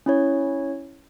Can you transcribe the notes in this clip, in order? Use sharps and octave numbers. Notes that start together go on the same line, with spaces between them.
C#4 E4 C#5